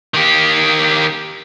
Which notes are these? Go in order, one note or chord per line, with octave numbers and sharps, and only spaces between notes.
D#3 G4